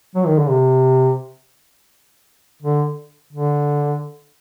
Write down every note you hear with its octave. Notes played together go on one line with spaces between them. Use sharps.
F#3
D#3
D3
C3
D3
D3